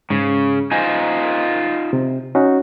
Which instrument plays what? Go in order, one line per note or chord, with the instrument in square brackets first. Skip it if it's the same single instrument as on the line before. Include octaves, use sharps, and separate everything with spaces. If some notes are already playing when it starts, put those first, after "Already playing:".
[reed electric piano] G#2 [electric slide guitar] C#3
[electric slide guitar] D#4 F4 C5 [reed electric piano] G#5
[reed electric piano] C3
C#4 D#4 F#4